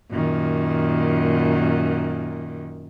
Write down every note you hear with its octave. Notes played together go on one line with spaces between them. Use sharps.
F#2 A#2 D#3